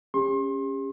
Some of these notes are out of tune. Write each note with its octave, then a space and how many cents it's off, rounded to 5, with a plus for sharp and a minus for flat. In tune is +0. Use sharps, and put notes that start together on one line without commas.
C#4 -5 G4 +40 C6 +35